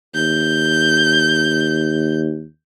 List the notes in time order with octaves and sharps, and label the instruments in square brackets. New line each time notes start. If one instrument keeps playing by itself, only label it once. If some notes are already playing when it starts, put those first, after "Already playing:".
[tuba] D#2 [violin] G6